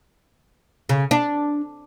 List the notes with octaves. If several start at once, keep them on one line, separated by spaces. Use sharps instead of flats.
C#3
D4